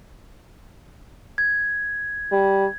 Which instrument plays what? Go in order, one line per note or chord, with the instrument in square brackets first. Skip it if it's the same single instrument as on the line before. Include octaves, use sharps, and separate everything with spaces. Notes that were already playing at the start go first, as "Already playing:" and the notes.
[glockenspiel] G#6
[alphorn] G3